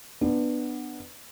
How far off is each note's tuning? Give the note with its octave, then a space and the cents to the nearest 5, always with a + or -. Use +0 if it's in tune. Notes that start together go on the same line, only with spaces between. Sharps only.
B3 +0 D4 +20